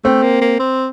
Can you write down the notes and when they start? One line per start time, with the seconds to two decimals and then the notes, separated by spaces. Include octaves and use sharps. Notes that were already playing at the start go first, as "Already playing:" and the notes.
0.05 A3 C4
0.23 A#3
0.41 A#3
0.60 C4